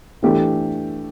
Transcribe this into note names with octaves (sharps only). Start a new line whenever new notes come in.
E3 A3 D4 G4